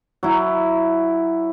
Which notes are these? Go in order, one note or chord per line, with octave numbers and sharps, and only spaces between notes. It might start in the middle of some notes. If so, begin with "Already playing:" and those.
F#3 E4